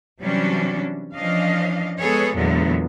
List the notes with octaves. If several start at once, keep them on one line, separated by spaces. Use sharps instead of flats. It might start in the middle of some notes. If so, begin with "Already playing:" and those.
C3 E3 F#3 G3 C#4 D4
E3 F3 C#4 D4 D#5 F5
G#3 B3 G#4 A4 B4 C#5
E2 A#2 D3 F#3 G#3 B3